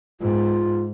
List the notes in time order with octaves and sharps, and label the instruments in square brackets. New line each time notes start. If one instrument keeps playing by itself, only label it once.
[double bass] G#2 [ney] F4